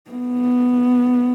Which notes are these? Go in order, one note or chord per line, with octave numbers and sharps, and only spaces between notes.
B3